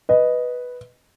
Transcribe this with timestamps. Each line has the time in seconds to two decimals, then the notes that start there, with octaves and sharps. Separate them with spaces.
0.09 B4 D#5